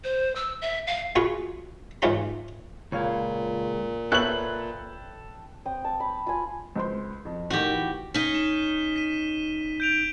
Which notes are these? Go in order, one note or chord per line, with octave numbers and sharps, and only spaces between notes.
C5
E6
E5
F5
B3 F4 F#4 G#4 B4
G#2 E3 C#4 F4 G4 B5
C#2 A#2 C#5 F5
A4 B4 C#5 E5 G5 F#6 F#7
C4 D#6
A5
B5
F4 G#5
C#2 C5 C6
F2
A2 D#3 F#4 G4 A4
E3
C#4 D#4 B6 D#7 G7
E7
B6 D#7
G6 D7 F7